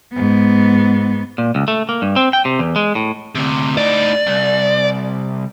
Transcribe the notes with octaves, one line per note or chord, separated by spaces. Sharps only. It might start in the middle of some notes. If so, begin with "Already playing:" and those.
G#2 B3
A#2
C#2
A3
A#3
G2
C4
G5
C3
E2
G#3
A2
D2 C3
A2 D#4 D5
C2